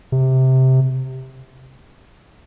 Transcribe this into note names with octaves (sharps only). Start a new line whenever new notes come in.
C3